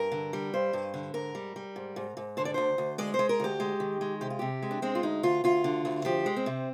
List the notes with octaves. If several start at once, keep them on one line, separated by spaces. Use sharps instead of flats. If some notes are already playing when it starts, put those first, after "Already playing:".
Already playing: G2 A#4
D3
G3
G2 C5
G2
D3
G#2 A#4
G3
G3
G#2
G#2
G#2
D3 C5
D5
D2 C5
D2
G#3 D5
C5
G#3
A#4
D2 G4
G#3
D#3
G#3
C3 G4
F4
C3 G4
G#3
D4
G#3 C4
F4
D2 D#4
D2 F4
D2 F4
D3
D2
F3 G4
G#3
C4
C3